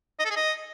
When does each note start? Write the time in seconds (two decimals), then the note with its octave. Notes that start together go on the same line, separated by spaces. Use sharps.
0.19 D#5
0.25 A4
0.31 G#4
0.36 D#5